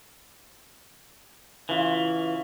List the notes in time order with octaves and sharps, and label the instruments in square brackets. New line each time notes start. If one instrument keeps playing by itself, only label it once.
[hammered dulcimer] C#3 F4 [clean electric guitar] E3